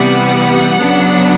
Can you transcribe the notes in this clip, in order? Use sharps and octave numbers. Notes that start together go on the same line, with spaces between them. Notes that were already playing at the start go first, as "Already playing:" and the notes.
Already playing: C3 E3 G3 B3 F#5
C#3 F#3 B3 D4